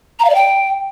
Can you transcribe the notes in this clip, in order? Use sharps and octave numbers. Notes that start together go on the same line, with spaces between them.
A#5
F5
D5
G5